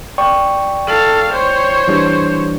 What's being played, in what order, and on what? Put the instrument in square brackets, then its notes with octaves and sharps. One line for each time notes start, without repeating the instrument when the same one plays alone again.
[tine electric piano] D5 G5 C#6
[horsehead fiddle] A4 F5
C5 C#5
[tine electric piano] E3 G3 D4